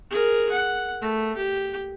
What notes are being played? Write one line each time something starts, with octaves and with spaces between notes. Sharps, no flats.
G#4 A#4
F#5
A3
G4